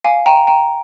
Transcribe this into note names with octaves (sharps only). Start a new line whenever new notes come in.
F5 G#5
G5 A#5
G5 A#5